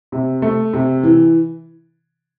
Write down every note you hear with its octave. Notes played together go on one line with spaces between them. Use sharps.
C3
A3
C3
E3